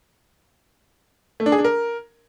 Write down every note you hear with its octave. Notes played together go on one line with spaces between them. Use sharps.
A3
D4
G#4
D4
A#4